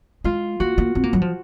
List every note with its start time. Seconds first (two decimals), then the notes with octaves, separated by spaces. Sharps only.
0.24 G#3 F4
0.60 A#3 F#4
0.78 A#3
0.95 C4
1.04 A#3
1.13 F#3
1.22 F3